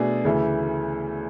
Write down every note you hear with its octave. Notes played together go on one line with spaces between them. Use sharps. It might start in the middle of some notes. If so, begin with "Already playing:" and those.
Already playing: B2 A3 D4 G#4
D2 C#3 E3 A3